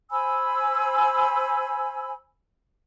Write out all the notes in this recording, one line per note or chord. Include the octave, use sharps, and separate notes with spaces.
C5 G#5 B5 E6